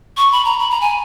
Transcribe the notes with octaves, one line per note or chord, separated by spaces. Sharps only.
C#6
B5
A#5
B5
A#5
G#5